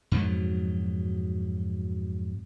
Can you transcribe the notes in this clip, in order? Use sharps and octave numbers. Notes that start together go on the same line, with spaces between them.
F2 G#2 B2 F#3